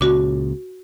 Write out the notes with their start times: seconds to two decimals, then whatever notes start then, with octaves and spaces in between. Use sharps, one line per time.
0.01 C#2 A#2 C#3 F#4 D6